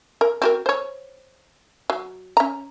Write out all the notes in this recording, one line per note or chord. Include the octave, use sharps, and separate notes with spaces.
A#4
C4 F#4 A#4
C5 C#5
F#3
C#4 A#5